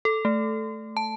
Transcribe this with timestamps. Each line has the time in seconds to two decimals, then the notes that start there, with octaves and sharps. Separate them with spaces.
0.05 A4
0.25 A3
0.97 A5